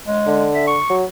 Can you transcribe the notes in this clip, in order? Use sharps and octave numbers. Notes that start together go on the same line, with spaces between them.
G#3
D3
E5
C#6
F#3